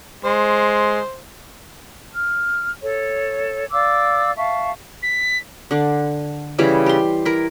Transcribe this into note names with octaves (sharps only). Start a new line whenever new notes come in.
G#3 C5
F6
A4 C#5
D5 F5 D6 E6
E5 F5 A5 C#6
B6
D3 D4
C#3 E3 G3 E4
G4 C6
E4 A#4